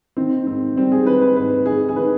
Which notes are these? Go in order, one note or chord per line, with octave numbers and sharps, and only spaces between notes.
D#3 C4
G#2 C4
G3 C4
G#4
D#3 B4
B4
G#2 B4
D#3 G#4
G#4
D#3 B4